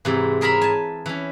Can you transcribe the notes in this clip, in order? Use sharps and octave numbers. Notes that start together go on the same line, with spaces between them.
G#2 C3 E3
G#4 A#4 E5 A#5 B5
G#5 A5
E3 C#4